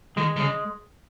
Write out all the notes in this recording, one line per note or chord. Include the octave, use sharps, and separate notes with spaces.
D#3 G#3
D#3
C#3 G#3